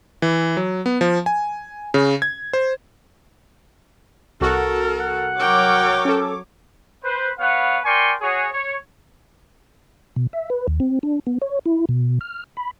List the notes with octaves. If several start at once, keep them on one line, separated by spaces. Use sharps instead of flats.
E3
F#3
B3
F3
G#5
C#3
G#6
C5
C2 F#4 A4 A#4
F#5
F#3 A#4 C#5 G5 D6
C#4 A4
B4 C5
B3 B4 C#5 F5 F#5
A#4 D5 G5 G#5 C6 C#6
F#4 G#4 C#5
C#5
B2
E5
B4
D#2
C4
D4
B3
C#5
E4
B2
F6
B5